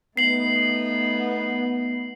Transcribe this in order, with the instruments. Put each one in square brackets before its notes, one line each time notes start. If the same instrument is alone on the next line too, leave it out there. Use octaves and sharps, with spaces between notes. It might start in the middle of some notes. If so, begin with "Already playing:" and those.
[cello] A3 D#4 [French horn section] B3 [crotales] C7 F#7